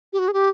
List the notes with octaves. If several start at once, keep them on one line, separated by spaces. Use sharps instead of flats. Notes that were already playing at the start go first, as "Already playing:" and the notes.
G4
F#4
G#4
G4